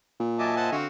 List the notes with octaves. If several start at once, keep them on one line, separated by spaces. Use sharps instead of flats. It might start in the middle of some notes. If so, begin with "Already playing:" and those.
A#2
F#3 D#5 E5 G#5 A5 D6
C5 F#5 A5
D3 C4 F#4 F5